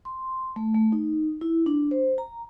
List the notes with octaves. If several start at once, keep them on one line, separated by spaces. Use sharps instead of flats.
C6
A3
A3
D#4
E4
D4
C5
A#5